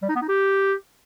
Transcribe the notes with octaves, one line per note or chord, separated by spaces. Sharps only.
G3
D#4
B3
D#4
G4